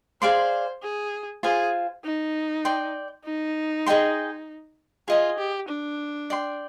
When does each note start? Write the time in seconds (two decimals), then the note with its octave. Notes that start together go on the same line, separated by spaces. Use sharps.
0.22 G#4 C5 D5 F5 C6
0.83 G#4
1.43 F4 G#4 C5 F5 G#5
2.04 D#4
2.65 D5 G5 C6
3.25 D#4
3.86 G#4 D#5 G5 C6
5.08 F4 G#4 D#5 G#5
5.38 G4
5.68 D4
6.30 D5 G5 C6